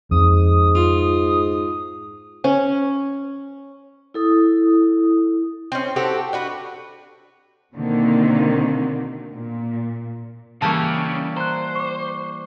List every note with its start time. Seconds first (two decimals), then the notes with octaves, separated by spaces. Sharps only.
0.11 F2 G#2 D#6
0.75 F4
2.44 C#4
4.14 E4 A4 D#6
5.72 C4 C#4
5.96 C4 F#4 G4 A4
6.33 D4 F#4 B4
7.73 B2 D3 D#3 A#3 C4
9.32 A#2
10.62 C#3 E3 G3 A#3 A5 C#6
11.37 C5 A#5 F#6
11.75 C#6 D6